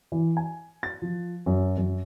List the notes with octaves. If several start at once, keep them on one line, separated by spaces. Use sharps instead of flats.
E3
G#5
A6
F3
F#2
F#2